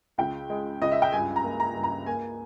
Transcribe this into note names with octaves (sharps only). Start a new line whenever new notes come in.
C#2 G5
G#3
C#2 D#5
E5
G5
G2 G#5
A#5
A#3
A#5
G2
A#5
A#3 G#5